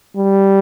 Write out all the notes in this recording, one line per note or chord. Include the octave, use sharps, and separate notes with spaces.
G3